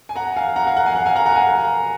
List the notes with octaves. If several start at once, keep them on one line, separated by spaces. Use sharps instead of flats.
G#5
F#5 A#5
F5 G#5
F#5 A#5
F5 G#5
F#5 A#5
F5 G#5
F#5 A#5
F5 G#5
F#5 A#5
F#5 A#5
F5 G#5